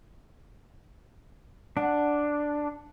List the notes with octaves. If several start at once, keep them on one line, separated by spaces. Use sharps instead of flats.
D4 F#5